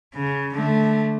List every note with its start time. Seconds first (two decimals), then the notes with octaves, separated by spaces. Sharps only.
0.15 C#3
0.54 D3 A3